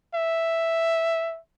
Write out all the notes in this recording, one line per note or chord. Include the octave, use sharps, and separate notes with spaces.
E5